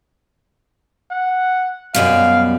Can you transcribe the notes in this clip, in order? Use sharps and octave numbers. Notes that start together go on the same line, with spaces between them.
F#5
F#2 B2 G3 F5